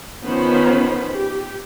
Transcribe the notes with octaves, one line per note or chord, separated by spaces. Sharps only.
D#3 F3 B3 C#4 C5 B5
G4